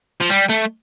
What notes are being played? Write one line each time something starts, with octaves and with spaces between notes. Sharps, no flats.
F3
G3
A3